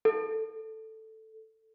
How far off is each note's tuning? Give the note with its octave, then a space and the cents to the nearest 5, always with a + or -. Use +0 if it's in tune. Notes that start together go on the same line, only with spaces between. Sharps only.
A4 +5